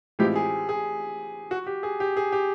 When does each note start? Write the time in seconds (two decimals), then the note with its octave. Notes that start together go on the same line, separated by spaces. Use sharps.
0.19 A2 E3 G#3 C4 F4 G4
0.36 G#4
0.69 G#4
1.51 F#4
1.67 G4
1.83 G#4
2.00 G4
2.17 G#4
2.32 G4